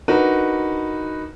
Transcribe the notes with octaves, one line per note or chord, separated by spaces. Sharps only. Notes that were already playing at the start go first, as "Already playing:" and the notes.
D4 D#4 F#4 A#4 B4